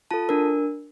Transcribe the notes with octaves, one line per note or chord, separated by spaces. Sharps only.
F4 A4 A5
D4 A#4